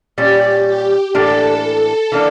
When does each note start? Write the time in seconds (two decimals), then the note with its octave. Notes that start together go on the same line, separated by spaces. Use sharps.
0.17 A#2 G3 C#4 G4
0.66 G4
1.14 A2 E3 A#3 D4 G4 A4
2.12 E3 A#3 D4